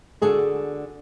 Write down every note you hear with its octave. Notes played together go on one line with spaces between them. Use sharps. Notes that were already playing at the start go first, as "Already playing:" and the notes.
D3 F#4 G#4 A4